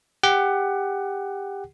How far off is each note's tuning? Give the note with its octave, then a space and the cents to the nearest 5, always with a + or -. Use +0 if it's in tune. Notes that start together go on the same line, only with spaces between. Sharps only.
G4 +20 F#5 +20